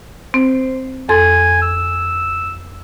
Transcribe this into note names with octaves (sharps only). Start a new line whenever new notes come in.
C4 C5
F2 A4 G#5 C6
E6